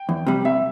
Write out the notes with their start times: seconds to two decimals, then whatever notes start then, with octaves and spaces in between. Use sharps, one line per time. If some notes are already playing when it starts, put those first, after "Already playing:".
Already playing: G5
0.09 E2
0.27 C3 G3
0.45 C2 E5